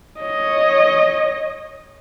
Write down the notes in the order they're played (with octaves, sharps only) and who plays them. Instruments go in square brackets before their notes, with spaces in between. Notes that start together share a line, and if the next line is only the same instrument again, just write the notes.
[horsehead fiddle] C#5 D#5